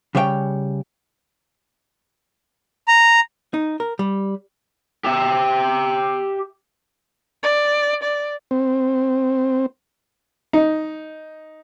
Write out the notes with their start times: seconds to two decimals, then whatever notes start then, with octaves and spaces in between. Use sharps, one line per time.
0.15 C#3 G3 C#5 E5 G5
2.88 A#5
3.54 D#4
3.80 A#4
3.99 G3
5.04 G4 E5
7.43 D5
8.03 D5
8.51 C4
10.53 D#4